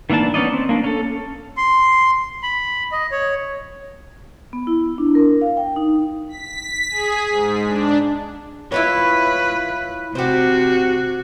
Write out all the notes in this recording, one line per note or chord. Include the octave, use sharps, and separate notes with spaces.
D#3 E3 A#3 D4 A5
B3 C#4 D#4 D5 D#5
C4
A#3 D4
C#4 A4
C6
B5
D#5
C#5
B3
E4
D4
A#4
F5
G5
D#4
B6
G#4
G#2
D4
E4 F4 B4 C#5
C3 F#4 G4 C5